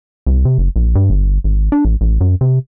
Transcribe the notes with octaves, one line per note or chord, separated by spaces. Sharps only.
C2
C3
F#1
A#1
G2
G1
G#1
D4
A1
A1
F#2
C3